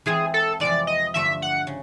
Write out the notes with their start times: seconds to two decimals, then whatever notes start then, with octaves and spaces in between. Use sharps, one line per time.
0.06 E3 G#3 C4 F4 G#4
0.34 A4
0.60 F2 C3 E3 G#3 D5
0.87 D#5
1.14 G2 D3 F3 A3 E5
1.42 F#5
1.67 C#3